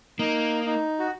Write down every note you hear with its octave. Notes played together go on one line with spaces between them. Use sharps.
A#3 D#4
D#4
F#4